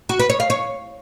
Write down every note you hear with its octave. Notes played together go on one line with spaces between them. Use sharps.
F#4
B4
C#5
F5
C#5